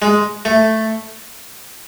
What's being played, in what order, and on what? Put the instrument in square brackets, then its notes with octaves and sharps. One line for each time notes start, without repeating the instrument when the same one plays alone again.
[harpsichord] G#3
A3